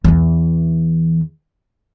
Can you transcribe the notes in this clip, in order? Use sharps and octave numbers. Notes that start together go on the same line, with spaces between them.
E2 E3